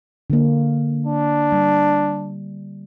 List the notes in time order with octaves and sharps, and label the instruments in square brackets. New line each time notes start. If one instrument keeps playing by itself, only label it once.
[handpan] D3 A#3
[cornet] D4
[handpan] G3